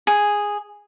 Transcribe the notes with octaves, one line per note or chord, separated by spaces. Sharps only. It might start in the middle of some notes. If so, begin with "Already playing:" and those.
G#4